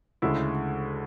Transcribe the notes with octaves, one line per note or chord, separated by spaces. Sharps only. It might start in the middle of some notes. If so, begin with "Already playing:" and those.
D2 C#3 G#3 E4